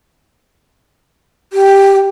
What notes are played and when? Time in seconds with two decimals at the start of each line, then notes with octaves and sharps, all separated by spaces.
1.53 G4